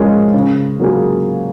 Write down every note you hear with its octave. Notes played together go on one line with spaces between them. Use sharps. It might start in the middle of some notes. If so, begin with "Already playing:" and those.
Already playing: F3 G#3 C#4 F4 A#4
C#3
F#3 A#3 F4 G#4